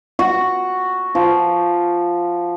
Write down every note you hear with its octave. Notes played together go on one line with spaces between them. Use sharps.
F#4
F3